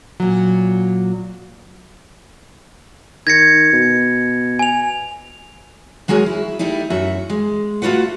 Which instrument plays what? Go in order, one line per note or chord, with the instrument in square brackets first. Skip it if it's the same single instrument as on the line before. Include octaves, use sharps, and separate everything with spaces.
[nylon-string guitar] A#2 F#3
[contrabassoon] D#3 [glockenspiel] G#6 A#6 C#7
[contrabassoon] B2
[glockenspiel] G#5 F7
[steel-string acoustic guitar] F#3 G#3 F#4 G#4 A#4
E4
G3 A3 D#4 E4
F#2 F#4 E5
G#3
A3 F4 F#4 B4 F#5